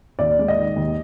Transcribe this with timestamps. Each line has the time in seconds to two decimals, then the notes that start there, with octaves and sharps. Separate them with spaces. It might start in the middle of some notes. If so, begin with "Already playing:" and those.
0.19 D#2 D5
0.39 G#3
0.48 D#5
0.58 D#3
0.76 D#2